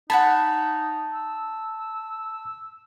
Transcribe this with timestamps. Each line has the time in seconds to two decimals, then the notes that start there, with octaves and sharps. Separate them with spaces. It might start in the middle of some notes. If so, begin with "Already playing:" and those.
0.10 D#4 F#5 G#5 A5 B5
1.14 E6